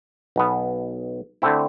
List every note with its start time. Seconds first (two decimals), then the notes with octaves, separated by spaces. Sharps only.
0.36 B1 B2 B3
1.42 D3 A3 C4 E4